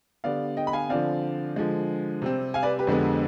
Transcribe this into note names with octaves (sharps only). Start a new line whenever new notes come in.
D3 G3 B3 D5 F5
D#5 G5
B5
F5 G#5
D3 F3 C4 D5 F5
D3 F3 G#3
C3 G3 C4
F5 G#5
B4 D5
G4 B4
F2 D3 G#3 B3